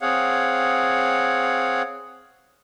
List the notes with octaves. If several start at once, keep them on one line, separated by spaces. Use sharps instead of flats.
C4 G#4 C#5 F5 F#5